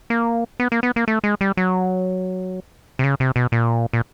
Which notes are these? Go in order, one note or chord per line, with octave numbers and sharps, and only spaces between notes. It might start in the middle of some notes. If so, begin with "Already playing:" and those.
A#3
B3
A#3
B3
A#3
A3
G#3
G3
F#3
C3
C#3
C3
B2
A#2
A#2